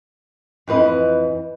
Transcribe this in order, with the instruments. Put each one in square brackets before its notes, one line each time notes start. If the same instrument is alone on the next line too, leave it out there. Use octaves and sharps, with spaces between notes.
[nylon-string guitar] F2 E3 B4 D#5